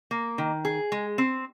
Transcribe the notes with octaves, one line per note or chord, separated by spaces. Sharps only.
A#3
D#3
G#4
G#3
C4